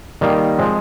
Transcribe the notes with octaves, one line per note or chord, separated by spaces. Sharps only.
D#3 G3 A#3
F3 G#3 C4